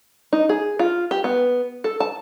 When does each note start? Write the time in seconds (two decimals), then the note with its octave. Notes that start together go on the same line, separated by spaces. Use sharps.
0.33 D#4
0.49 G#4
0.79 F4
1.11 G4
1.24 B3
1.84 A4
2.00 A5